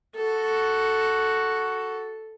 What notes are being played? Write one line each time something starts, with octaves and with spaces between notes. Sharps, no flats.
F#4 A4